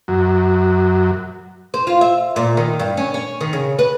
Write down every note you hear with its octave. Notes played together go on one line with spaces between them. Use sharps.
F#2
C5
F4
E5
A#2
D#3
G2
C#4
C#4
D#3
C#3
B4